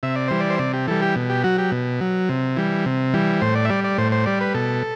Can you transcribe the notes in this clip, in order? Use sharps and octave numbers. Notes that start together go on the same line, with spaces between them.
C3 E5
D5
E3 G3 C5
D5
C5
C3 D5
G4
E3 G3 A4
G4
B2
G4
F#3 F#4
G4
B2
F#3
C3
E3 G3
C3
E3 G3
A2 C5
D5
E5
G3 D5
D5
A2 C5
C5
G3 D5
B4
B2 A4